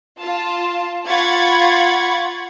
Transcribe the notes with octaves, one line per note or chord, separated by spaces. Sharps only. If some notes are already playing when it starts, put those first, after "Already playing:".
F4 A5
F4 F#5 B5 C#6 G#6 A6